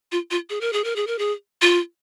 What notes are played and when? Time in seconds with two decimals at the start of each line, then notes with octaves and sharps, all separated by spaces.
0.12 F4
0.31 F4
0.50 G#4
0.61 A#4
0.73 G#4
0.84 A#4
0.96 G#4
1.07 A#4
1.19 G#4
1.62 F4